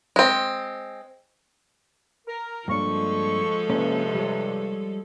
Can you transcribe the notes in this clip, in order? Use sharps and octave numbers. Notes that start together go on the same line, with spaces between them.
G#3 C4
A#4
G2 F3 G#3 A#3 D4 A4 C#6
G2 C3 A#3 C#4 C#5
G3 C#5